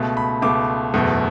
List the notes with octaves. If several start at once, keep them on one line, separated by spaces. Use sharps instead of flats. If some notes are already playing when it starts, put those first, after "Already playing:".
Already playing: C#2 B2 A3
B5
C#2 B2 A3 D6
F#1 E2 B2 A3